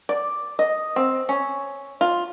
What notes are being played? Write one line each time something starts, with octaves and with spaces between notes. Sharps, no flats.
D5
D#5
C4
C#4
F4